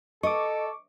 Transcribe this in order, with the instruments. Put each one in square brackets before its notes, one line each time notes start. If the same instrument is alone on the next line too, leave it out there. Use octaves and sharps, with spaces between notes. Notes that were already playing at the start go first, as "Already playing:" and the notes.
[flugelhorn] A4 [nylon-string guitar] D#5 [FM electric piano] C#6 D6